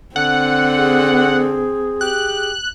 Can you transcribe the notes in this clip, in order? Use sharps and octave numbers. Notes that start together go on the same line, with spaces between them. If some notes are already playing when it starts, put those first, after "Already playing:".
D3 C4 F#5
G#4
G4 F#6